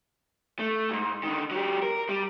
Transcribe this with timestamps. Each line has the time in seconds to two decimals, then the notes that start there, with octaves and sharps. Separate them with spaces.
0.59 A3
0.90 C2 G#2
1.23 D3 D#3
1.51 F#3 G4
1.82 A#4
2.09 G3